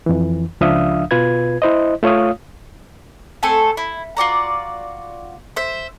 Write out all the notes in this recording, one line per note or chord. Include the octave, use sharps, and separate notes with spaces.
F2 E3
C#2 F3 D4 E5 F5 D#6
B2 F4 B4 G#6
E4 C5 D#5
A3 F4 C#5 F5 D#6
A3 C4 A4 G#5
E4
F4 F#4 D5 A#5
C5 E5